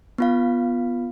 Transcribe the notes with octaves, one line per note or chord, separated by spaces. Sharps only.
B3 F4 F5